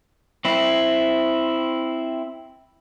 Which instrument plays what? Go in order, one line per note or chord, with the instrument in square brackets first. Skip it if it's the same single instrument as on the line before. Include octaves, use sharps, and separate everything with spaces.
[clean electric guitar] C4 E4